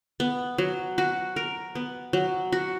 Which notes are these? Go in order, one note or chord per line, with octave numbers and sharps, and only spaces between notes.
B3
F#3
F#4
A#4
B3
F#3
F#4